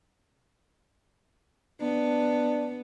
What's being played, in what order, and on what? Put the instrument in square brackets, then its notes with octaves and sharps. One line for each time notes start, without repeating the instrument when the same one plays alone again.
[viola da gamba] B3 [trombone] D4